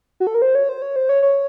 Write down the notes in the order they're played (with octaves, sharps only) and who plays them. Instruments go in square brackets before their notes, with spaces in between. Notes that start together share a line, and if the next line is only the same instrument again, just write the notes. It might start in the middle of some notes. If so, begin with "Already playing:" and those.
[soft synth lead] F#4
A4
A#4
C5
C#5
C5
C#5
C5
C#5
C#5